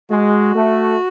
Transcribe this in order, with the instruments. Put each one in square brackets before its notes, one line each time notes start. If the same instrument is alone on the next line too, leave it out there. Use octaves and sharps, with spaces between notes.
[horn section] G#3 [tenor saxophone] F#4
[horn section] A3